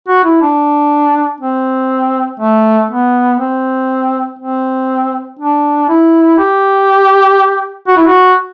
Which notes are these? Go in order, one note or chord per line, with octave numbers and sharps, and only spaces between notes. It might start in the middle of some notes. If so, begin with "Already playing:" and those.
F#4
E4
D4
C4
A3
B3
C4
C4
D4
E4
G4
F#4
E4
F#4